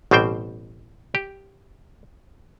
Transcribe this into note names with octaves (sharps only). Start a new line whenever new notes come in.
A1 B2 G3 C4 C5 G5
G4